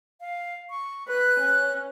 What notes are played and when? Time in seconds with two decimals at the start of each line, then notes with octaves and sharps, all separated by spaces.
0.21 F5
0.70 C#6
1.08 B4 F#6
1.40 C#4